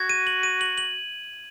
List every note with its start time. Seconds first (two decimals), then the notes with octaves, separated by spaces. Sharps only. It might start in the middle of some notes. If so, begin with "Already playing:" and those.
Already playing: F#4 G#6
0.09 D#7
0.27 F#7
0.43 D#7
0.61 F#7
0.78 F#7